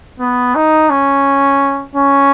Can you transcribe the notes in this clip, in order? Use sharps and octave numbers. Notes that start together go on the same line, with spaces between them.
B3
D#4
C#4
C#4